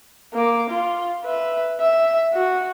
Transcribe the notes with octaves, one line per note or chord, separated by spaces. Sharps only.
A#3 D6
F4
B4 E5
E5
F#4